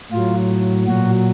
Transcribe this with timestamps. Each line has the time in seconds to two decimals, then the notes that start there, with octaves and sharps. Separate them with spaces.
0.12 A2 F#3 F4
0.87 A#2 F#3 F#4